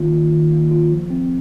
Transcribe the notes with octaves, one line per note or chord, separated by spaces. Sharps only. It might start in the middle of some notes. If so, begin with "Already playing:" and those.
Already playing: D#3 A#3 F4
D#3
D#3
A#3
F4
F3
C4